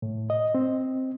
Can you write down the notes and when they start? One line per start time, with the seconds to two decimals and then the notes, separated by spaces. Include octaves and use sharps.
0.02 A2
0.30 D#5
0.55 C4